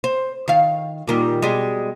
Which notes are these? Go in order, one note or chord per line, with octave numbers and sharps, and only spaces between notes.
C5
D#3 F5
A#2 D#3 G3
B2 G3 G#3